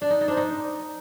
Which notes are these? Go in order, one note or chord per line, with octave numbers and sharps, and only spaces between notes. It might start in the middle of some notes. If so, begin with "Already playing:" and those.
D4 D5
D#4
D#4
D4 C5
D#4